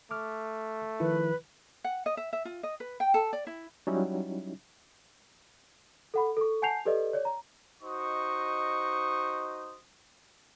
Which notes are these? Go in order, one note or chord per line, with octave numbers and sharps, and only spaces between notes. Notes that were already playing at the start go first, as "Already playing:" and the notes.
A3 D6 F6
D#3 F3 E4 B4
F#5
D#5
E5
E5
F4
D#5
B4
G5
A4
D5
E4
F#3 G3 C#4 D#4 E4
A4 F#5 B5
A4 C#6
F#5 G#5 A5 G6 C7 F7
G4 A4 B4 D5 D#5
C#5 D5
A#5
D#4 F#4 C5 D#5 C#6 D#6